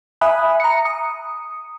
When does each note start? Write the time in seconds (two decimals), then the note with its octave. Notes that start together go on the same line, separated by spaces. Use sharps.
0.21 E5 G#5 B5 D#6 F#6
0.60 A#5 C#7
0.85 D#6